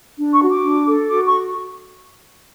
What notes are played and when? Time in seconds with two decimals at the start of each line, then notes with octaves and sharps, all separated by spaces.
0.18 D4
0.33 C#6
0.42 F#4
0.49 D6
0.64 D4
0.87 A4
1.10 F#4 D6
1.26 C#6